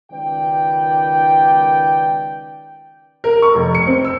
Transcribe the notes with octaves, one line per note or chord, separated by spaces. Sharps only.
C#2 D#3 B4 D5 G5
A#4
C#6
F1
C#7
C4
E6